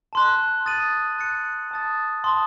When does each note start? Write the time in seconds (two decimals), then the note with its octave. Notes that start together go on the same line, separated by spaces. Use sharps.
0.13 A5 C6 F#6
0.66 D#6 A6 D#7 F#7
1.18 F#6 A6 C#7
1.71 A5 D#6 A6
2.24 A5 C6 D#6